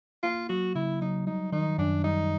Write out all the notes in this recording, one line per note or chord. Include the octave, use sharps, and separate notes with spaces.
A#3 F4
F#3 F#4
C#3 E4
F#3 D#4
G3 D#4
D#3 D#4
F#2 D4
G3 D#4